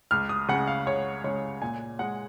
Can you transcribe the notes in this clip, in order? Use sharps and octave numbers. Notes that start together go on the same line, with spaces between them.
C#2 F6
D#6
C#3 G#3 F#5
F5
C#2 C#5
C#3 G#3 C#5
A#2 G#5
G#3 F#5